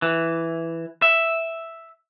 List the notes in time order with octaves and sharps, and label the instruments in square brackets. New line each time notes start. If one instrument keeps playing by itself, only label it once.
[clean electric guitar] E3
E5